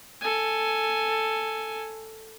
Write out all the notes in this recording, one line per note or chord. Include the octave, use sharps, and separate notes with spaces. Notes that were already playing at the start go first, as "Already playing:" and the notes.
A4 G#5